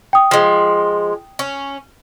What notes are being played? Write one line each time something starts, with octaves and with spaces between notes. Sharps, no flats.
G5 D#6
F3 G#3
C#4